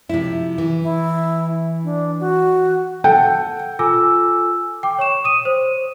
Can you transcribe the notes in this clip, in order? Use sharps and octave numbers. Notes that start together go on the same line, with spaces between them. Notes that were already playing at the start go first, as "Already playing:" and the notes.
C3 F3 E4
E3
E4
D4
F#4
A4 F#5 G5
F4 A4 G#5 D6 E6
G5 D6
C#5 C#6 E7
D#6 D#7
C5